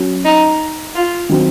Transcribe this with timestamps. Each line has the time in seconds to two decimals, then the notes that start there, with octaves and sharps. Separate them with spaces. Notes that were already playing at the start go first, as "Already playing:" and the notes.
Already playing: F#3 C#4 F#4
0.24 D#4
0.95 F4
1.29 D#3 F#3 C4